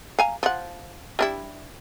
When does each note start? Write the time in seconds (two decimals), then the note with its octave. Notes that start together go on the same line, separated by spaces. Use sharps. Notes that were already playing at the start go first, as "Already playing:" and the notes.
0.19 F5 G#5 A#5
0.43 F3 F#5
1.19 G3 D4 E4